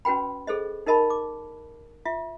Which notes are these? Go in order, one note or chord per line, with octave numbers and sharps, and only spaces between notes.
C#4 F#4 B4 G5 B5
G#4 A4 C5 D#5
D#4 A#4 D#5 A5 B5
D6
F4 E5